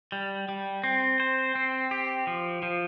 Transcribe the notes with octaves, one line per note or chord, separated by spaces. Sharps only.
G3
G3
C4
C5
C4
G4
F3
F3